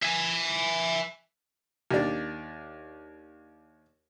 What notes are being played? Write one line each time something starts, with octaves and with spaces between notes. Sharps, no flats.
E5 G#5
D#2 D4